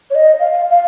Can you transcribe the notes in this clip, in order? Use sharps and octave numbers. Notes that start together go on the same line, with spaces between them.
C#5
D#5
F5
F5